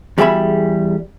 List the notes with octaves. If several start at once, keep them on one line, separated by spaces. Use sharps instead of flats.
E2 G3 F#4 G#4 E5 B5